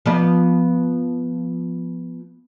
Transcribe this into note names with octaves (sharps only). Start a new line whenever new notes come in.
F3 B3 D5